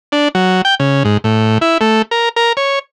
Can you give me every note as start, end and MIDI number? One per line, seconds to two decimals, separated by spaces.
0.12 0.28 62
0.35 0.62 54
0.65 0.75 79
0.80 1.03 49
1.05 1.17 44
1.24 1.58 45
1.61 1.78 64
1.81 2.02 57
2.11 2.29 70
2.36 2.53 70
2.57 2.79 73